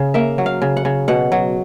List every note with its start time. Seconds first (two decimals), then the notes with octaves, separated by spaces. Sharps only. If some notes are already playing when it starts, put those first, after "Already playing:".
Already playing: C#3
0.14 A#3 E5
0.38 F#3
0.46 F5
0.62 C#3
0.77 F#5
0.85 C#3
1.08 B2 F#5
1.32 F#3